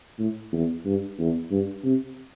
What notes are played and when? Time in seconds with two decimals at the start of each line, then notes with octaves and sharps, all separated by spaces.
0.19 A2
0.52 E2
0.86 G2
1.19 E2
1.51 G2
1.84 C3